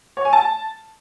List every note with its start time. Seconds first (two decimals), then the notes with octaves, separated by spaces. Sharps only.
0.17 C#5
0.25 G#5
0.33 A5